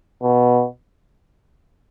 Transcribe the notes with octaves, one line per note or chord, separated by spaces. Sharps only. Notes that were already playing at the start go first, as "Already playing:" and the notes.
B2